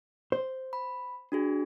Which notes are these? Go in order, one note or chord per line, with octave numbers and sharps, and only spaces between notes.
C5
B5
D4 F#4 G#4